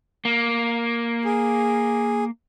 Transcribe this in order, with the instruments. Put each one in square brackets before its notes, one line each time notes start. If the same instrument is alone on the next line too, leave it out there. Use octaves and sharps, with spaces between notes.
[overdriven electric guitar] A#3
[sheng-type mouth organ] G#4